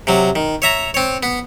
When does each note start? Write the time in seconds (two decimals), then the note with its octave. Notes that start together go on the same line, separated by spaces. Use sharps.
0.07 C3 F#3
0.35 D#3
0.62 C#5 E5 A#5
0.94 C4 C#5
1.23 B3